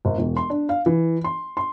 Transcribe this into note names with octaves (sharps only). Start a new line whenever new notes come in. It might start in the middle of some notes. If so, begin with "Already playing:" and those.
G#1
E1
C6
D4
F5
E3
C6
C6